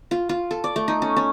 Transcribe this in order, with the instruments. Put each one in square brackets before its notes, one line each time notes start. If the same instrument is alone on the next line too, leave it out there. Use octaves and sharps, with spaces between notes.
[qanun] F4
F4
A4
D5
A3
D#4
C#4
C#4